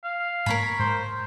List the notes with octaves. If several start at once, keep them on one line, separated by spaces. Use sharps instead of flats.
F5
G#2 A#3 A#4 C#5 B5
G#2 C5